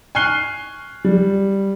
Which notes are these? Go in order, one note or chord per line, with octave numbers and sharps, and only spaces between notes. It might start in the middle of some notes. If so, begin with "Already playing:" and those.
G#5 C#6 F6 F#6 C7 G7
G3